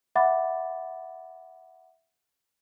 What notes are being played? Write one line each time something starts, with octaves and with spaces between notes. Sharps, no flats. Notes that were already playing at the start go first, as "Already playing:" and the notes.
E5 F#5 B5 D6 A6